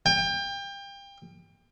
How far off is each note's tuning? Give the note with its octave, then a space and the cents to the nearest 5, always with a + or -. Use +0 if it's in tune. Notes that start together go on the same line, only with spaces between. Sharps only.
G5 +30